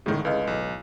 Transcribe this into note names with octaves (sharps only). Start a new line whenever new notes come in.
A1 A2 D3 D#3 G#3
C#2 B4 D#5 F5
B1